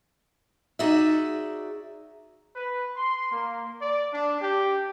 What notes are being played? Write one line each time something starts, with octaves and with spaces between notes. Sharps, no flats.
D#4 F#4 G#4 D5 E5
B4
C6
A#3
D5
D4
G4